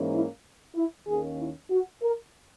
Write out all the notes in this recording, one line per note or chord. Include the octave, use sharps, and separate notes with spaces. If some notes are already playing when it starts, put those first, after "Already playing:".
Already playing: G#2 E3 A#3 C#4
E4
E4
D#2 D#3 A#3 C#4 G#4
E4
F#4
A#4